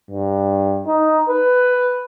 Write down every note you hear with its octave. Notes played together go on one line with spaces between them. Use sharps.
G2
D#4
B4